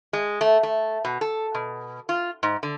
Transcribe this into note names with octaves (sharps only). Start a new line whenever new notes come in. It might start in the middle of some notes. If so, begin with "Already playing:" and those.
G#3
A3
A3
B2
A4
B2
F4
G#2
D3